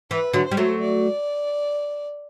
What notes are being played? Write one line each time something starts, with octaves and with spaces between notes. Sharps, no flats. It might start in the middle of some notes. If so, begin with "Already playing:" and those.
E3 B4
D3 F#3
C5
G3
F#3 A3
D5